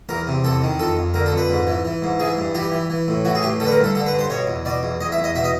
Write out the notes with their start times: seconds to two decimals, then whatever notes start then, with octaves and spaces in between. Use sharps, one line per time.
0.09 E2 A#4
0.27 C3
0.44 E2 A4
0.62 D#3
0.79 F2 A4
0.97 F2
1.14 D3 A#4
1.26 A4
1.32 F2
1.38 B4
1.49 G#2
1.67 E3
1.85 E3
2.02 G#2
2.20 E3 G#4
2.37 G2
2.55 E3 G4
2.72 E3
2.90 E3
3.08 A2
3.25 E3 F#4
3.35 G#4
3.42 A2 G4
3.60 D3 A4
3.66 B4
3.71 A#4
3.78 G2
3.84 A4
3.95 D3 A4
4.06 B4
4.13 G2
4.19 C5
4.30 B2 C#5
4.47 E2
4.65 B2 D5
4.83 E2
5.01 E2 D#5
5.12 E5
5.18 E2
5.24 D#5
5.35 B2 E5
5.44 D#5